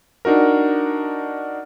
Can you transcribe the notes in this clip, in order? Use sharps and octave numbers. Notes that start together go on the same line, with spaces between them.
D4 D#4 F#4 A#4